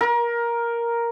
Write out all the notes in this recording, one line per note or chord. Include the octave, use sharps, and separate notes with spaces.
A#4